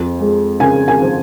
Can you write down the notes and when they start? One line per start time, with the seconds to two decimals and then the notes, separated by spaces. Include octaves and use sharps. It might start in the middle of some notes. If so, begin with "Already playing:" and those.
Already playing: F2
0.20 G#3
0.60 C#3 G#5
0.88 G#5
1.02 F3